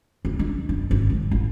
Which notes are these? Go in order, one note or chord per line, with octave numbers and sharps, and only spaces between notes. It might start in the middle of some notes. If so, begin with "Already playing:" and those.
D2
D4
F#2
G#1
G#2
A1